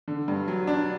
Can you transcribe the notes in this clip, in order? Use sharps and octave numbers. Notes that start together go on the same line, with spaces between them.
D3
G2
F#3
D4